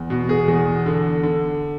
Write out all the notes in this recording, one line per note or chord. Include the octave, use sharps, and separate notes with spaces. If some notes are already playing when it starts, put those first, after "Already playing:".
Already playing: E2
B2
G#4
E2
D3
D3